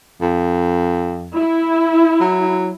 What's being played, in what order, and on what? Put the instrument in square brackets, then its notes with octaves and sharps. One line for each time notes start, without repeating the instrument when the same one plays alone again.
[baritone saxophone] F2
[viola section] E4
[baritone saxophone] F#3